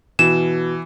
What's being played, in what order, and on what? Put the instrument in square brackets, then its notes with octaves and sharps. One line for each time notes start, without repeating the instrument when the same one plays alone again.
[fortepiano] B2 [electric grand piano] E3 [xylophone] E7